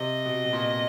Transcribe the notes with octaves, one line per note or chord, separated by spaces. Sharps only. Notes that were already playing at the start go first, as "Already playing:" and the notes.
Already playing: C3 D#5
B2
B2
A#2